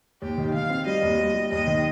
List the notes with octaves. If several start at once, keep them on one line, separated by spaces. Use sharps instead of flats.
D#2 G4
D#3
D#3 F5
C4
G3 D#5
D#2
G3
G3
D#2 D#5
D#3